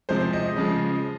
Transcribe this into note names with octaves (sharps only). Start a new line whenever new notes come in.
C3 F3 G#3 C5
D#5
C#3 F3 G#3